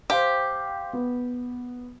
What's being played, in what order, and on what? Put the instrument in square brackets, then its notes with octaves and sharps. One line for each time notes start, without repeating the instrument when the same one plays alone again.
[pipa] G4 [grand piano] C5 F5 G5
[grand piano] B3